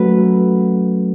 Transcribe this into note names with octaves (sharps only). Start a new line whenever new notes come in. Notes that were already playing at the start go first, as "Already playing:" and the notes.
Already playing: F#3 A3 C#4 B4